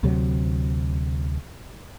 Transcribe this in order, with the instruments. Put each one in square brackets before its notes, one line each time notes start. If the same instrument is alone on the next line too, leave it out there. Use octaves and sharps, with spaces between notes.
[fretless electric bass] D2 C3 F#3